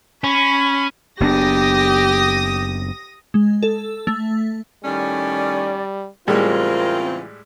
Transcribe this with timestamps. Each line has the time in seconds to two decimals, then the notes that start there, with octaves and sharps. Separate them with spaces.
0.24 C#4 B5
1.20 F#1 B3 D4 G4 D#6 A#6
3.34 G#3
3.63 A4
4.07 A3
4.85 A2 D#3 G3 C#4 D5
6.28 A2 C#3 E3 G3 G#3 C4 F4 A#4